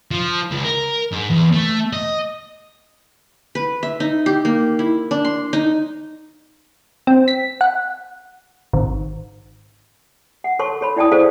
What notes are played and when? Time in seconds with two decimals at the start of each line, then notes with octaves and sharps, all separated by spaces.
0.11 F3
0.51 C#2
0.64 A#4
1.11 G#2
1.30 E2
1.54 A3
1.93 D#5
3.55 B4
3.83 E5
4.00 D#4
4.26 G4
4.45 A#3
4.79 E4
5.11 D4
5.25 C6
5.53 D#4
7.07 C4
7.28 B6
7.61 F#5
8.73 G#1
10.44 F#5
10.59 A4 C#5 A5 C6 C#6
10.81 A4 C#5 B5
10.97 E4 D5 G5 A5 D#6
11.12 E4 G#4 A4 C5 D5 F5